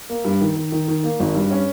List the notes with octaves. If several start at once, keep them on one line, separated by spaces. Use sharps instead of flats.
A#3
G2
D#3
D#3
D#3
D#3
A#3
G#1
G2
C#4